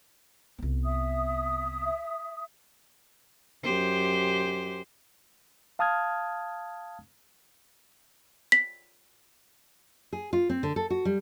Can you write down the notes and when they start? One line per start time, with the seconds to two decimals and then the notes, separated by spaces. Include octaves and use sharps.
0.58 C2 B3
0.84 E5 D#6
3.63 F#2 G4 C5
5.79 F5 A5 D#6 F6 G#6
8.52 B6
10.13 G#4
10.33 F4
10.49 C4
10.63 D3
10.76 A4
10.90 F#4
11.05 G3